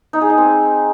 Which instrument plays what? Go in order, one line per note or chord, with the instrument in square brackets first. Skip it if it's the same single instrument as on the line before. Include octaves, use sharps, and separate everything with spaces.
[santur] D#4
G#4
D#4
C4